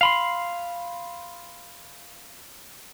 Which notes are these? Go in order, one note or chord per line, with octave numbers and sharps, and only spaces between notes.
F5 B5 C6